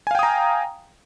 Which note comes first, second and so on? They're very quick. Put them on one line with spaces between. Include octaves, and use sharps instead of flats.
G#5 F5 G5 D#6 A#5